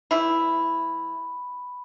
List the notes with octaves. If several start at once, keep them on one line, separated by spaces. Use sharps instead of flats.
E3 G3 E4 B5